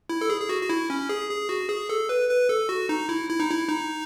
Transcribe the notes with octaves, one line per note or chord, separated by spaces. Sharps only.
E4
A4
G#4
G#4
F#4
F#4
E4
C#4
G#4
G#4
F#4
G#4
A4
B4
B4
A4
F#4
D#4
E4
E4
D#4
E4
D#4